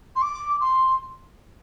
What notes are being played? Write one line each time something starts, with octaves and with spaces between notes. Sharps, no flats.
C6
D6
C6